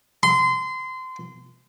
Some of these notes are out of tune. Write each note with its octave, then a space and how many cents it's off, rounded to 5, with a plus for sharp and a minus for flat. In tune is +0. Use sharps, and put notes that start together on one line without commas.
C6 -25